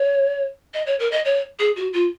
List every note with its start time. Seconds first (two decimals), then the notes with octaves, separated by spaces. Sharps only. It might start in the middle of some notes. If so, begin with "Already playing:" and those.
Already playing: C#5
0.74 D#5
0.87 C#5
0.99 A#4
1.12 D#5
1.25 C#5
1.59 G#4
1.76 F#4
1.93 F4